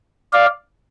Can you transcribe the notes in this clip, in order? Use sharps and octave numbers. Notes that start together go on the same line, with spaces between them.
D5 F5